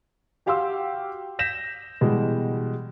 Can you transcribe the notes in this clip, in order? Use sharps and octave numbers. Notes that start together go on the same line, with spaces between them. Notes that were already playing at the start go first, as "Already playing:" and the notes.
F#4 G4 F5 G5 C6 E6
G6 A#6 B6 E7
B2 E3 G3 G#3